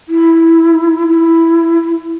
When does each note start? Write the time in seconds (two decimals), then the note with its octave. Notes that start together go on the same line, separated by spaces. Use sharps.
0.09 E4
1.08 E4